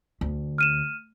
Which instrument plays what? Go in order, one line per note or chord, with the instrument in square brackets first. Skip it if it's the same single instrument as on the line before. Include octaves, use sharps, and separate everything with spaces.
[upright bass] D2
[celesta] F6 D#7 E7